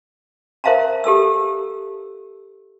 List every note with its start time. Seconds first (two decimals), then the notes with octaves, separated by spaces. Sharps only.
0.64 A#4 C5 E5 F5 A5 A#5
1.04 G4 A4 A5 E6